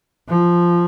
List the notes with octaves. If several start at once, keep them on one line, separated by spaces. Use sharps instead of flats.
F3